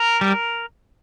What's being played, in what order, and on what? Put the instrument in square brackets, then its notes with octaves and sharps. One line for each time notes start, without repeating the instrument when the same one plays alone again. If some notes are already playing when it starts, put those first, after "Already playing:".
Already playing: [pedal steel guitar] A#4
G3